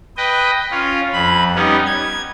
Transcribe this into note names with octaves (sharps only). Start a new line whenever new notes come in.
B4 D#5 G5
C#4 F4
F2 B5
G3 B3 C#4 D#4
G#6